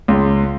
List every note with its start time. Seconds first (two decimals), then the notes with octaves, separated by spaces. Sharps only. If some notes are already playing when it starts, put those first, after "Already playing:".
0.08 C#2